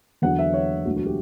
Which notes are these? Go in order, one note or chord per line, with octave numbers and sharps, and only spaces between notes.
E2 D3 F#3 F#5
E5
C#5
E1 D2 D3 F#3 F#4
F#4
G4